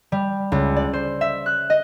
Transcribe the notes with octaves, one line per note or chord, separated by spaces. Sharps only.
G3
C#2
D5
C5
E5
F#6
D#5